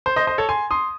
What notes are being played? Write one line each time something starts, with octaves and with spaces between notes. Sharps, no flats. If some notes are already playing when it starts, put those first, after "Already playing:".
C5
C5 D#5
C5 D#5
A4 C#5
G#5 C6
C6 D#6